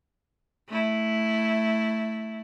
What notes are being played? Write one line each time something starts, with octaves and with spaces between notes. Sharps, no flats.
A3 E4